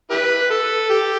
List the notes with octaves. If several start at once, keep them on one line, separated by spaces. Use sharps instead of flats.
E4 G4 B4
A4
G4